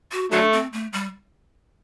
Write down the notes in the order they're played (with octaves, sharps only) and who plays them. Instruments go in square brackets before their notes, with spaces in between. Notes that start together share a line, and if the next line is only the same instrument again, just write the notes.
[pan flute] F#4
[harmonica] D3 F#3 A3 [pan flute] D4
[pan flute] C4
A3
G3